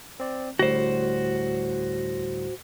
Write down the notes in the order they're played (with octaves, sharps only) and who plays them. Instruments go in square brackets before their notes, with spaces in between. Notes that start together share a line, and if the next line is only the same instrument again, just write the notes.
[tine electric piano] C4 D5
[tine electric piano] D2 A2 G3 [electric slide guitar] F#4 C5